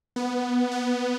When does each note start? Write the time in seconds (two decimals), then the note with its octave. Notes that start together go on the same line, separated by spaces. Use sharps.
0.16 B3
0.71 B3